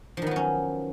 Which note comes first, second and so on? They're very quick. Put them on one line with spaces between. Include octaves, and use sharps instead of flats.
F3 D#3 B3 F#3 C#4